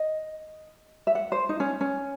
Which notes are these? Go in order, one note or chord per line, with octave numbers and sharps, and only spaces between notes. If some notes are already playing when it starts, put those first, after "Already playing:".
Already playing: D#5
E5
F#5
C5
D#4
C#4
C#4